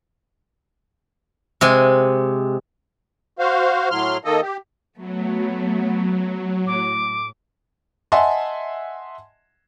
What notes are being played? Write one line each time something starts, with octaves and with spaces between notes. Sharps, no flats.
C3 G#3 G#5
F#4 C5 F5
A2 F#3 C6 F6
D#3 A#3 A4 D#5
G4
F#3 A3 B3
A2 D6
D#5 E5 F#5 G#5 A5 C6